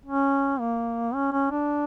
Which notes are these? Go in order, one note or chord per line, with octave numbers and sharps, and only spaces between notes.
C#4
A#3
C#4
C#4
D4